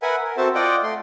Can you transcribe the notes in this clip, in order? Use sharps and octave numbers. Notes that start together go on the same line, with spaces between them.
A#4 B4 E5 F#5 G#5
A#4
C4 F#4 A4 C5 E5 A5
F4 D5 D#5 F#5 G5
A3 C6